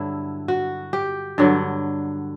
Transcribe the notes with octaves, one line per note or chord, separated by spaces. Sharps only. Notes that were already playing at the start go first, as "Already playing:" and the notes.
Already playing: G2 D3 F#3 E4
F#4
G4
G2 D3 F#3